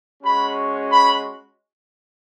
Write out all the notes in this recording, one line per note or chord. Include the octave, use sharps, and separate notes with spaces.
G#3 C#4 F#4 B5
B5